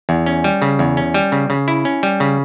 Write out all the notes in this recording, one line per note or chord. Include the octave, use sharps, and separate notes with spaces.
E2
C#4
G3
C#3
E2
C#4
G3
C#3
C#3
E4
C#4
G3
C#3